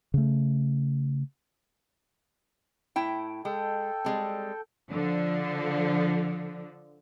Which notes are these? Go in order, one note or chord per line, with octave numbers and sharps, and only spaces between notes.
C#3 A3
A2 E4 G5
G#3 A4 G5
G3 G#3 C4
D3 F3